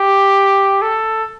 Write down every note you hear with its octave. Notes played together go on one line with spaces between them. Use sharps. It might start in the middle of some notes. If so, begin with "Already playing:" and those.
Already playing: G4
A4